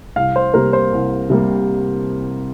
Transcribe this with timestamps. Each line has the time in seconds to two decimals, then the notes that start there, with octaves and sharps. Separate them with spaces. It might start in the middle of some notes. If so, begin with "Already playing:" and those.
0.16 C2 F5
0.36 C5
0.54 C3 G3 A#3 A#4
0.73 C5
0.93 C2
1.30 C3 G3 A#3